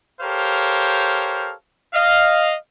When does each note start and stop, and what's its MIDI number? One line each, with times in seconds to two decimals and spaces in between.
0.21 1.53 67
0.21 1.53 69
0.21 1.53 70
0.21 1.53 72
0.21 1.53 73
0.21 1.53 77
1.94 2.56 75
1.94 2.56 77